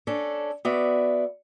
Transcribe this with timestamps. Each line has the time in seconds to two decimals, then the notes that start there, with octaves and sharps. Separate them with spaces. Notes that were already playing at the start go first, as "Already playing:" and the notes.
0.07 C#4 D4 A4
0.65 B3 F#4 D5 E5